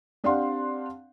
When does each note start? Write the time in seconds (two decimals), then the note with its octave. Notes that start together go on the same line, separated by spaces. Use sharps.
0.24 C4 D4 G4 F5 F#5 C6